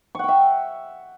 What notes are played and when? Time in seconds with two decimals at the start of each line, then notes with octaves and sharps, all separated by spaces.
0.15 C#6
0.19 F#5
0.24 G5
0.28 E5